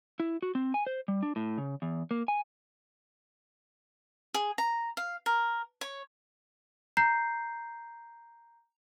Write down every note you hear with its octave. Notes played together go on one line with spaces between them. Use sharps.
E4
F#4
C4
G#5
C5
G3
D4
A2
C#3
E2
A#3
G#5
G#4
A#5
F5
A#4
C#5
A#5 G6 C7